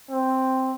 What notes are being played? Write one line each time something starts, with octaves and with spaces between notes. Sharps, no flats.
C4